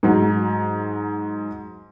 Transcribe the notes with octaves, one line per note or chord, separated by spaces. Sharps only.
G#2 F#3